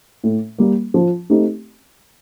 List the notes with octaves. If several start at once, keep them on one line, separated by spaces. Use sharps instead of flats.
A2
G3 A#3
F3
A3 C4 D#4 G4